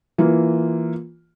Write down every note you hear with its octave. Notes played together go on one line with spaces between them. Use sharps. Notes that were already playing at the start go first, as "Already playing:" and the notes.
E3 A#3 F4